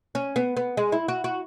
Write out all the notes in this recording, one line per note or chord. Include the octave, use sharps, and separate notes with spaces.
C#4
B3
B3
G#3
E4
F#4
F#4